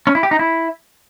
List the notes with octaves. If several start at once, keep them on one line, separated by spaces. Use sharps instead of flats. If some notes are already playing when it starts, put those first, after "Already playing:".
C#4
E4
G4
D#4
E4